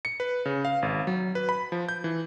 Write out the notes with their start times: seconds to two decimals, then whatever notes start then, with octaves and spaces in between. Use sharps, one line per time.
0.05 C#7
0.20 B4
0.45 C#3
0.65 F5
0.82 G#1
1.07 F#3
1.35 B4
1.49 B5
1.72 F3
1.89 G6
2.04 E3